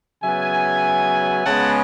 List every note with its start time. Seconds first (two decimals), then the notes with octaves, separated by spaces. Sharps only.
0.22 C#3 F#3 B3 E5 G#5
1.45 C#3 G#3 B3 F#5 A5